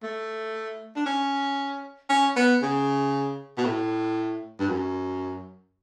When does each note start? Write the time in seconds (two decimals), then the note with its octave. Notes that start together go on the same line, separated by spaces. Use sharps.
0.03 A3
0.96 D4
1.06 C#4
2.09 C#4
2.36 B3
2.62 C#3
3.58 B2
3.65 A2
4.59 G2
4.69 F#2